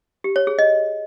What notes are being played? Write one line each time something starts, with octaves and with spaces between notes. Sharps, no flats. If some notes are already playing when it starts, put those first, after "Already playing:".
G4
C#5
G#4
D#5